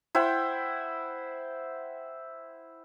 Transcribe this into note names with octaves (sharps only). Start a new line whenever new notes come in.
E4 C5 F#5 G5